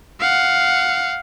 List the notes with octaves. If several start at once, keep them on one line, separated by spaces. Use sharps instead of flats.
F5 F#5